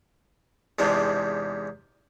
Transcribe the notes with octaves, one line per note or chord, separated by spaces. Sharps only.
E2 G#2 C3 D4